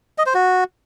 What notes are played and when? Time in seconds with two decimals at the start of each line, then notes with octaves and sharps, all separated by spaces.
0.18 D#5
0.26 C5
0.34 F#4